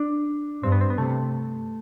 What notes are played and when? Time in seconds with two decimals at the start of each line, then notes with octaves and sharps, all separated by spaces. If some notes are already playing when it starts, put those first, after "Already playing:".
Already playing: D4
0.63 G2 C4
0.72 B3
0.81 C4
0.90 B3
0.98 C3 A3